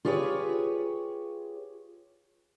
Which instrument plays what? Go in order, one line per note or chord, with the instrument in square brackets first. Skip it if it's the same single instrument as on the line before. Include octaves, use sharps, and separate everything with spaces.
[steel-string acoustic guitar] F4 G4 G#4 B4 C#5